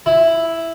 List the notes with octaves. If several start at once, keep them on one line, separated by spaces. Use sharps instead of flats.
E4